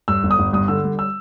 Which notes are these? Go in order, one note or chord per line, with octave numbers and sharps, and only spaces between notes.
G2 E6
G1
D#6
G1
G2 D#6
D3 E6
G3
E6